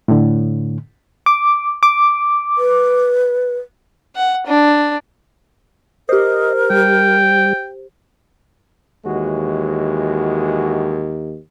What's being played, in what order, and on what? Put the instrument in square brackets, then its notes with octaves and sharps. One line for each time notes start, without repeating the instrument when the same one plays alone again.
[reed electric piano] A2 D3
[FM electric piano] D6
D6
[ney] B4
[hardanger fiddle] F#5
D4
[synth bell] G4 C5 [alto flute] A#4 [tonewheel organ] D#5
[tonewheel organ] G3 [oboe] G5
[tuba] D#2 [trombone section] E3 G#3 F#4